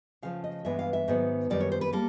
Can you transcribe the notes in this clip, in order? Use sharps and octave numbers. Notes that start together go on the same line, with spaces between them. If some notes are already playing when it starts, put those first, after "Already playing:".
C#3 F3 A3 F5
D#5
G2 E3 G#3 B3 E5
F5
E5
G#2 D#3 F#3 B3
F#2 D#3 G3 B3 D5
C#5
C5
B4
G3 A#3 A4